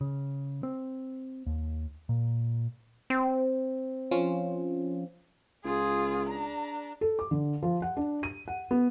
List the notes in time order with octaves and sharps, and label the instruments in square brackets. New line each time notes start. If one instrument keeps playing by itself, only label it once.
[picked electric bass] C#3
C4
D#2
A#2
[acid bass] C4
[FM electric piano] F3 C#4 F4
[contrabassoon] C#2 [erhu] F4 [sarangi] G#4
[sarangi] D4 [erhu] A#5
[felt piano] A4
D6
D3
F3
F#5
D4
D#7
F#5
B3